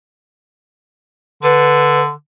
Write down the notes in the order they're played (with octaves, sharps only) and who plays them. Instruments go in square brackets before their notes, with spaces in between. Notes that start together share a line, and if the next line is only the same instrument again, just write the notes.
[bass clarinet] D3 [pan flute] B4